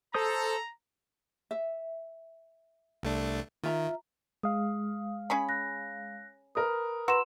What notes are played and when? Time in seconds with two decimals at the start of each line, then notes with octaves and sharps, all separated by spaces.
0.14 A4 C5 A#5 D#6
1.51 E5
3.03 C2 A3 D4
3.64 D#3 F4 E5 A#5
4.43 G#3 F5 D#6
5.30 C#4 G#4 B5
5.49 F#6 A#6
6.55 A#4 B4 D#6
7.08 F#4 B4 A#5 C6 E6 E7